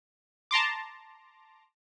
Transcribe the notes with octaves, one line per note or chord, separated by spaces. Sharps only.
A5 A#5 C6 D6